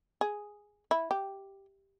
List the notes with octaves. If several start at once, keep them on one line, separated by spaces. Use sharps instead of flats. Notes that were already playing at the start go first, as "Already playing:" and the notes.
G#4
E4
G4